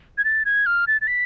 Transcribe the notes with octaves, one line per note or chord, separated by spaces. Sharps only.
G#6
A6
G#6
F6
A6
A6
B6